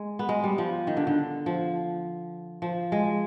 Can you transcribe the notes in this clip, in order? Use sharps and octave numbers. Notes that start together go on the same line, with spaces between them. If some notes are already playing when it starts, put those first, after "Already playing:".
Already playing: G#3
B3
G#3
G3
F3
D#3
D3
D3
F3
F3
G#3